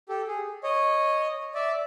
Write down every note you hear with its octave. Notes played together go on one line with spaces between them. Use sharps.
G4 A4
G#4
C#5 D#5
D5 E5